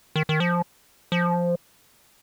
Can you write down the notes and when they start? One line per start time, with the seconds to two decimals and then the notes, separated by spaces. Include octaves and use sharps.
0.16 D#3
0.29 D#3
0.40 F3
1.12 F3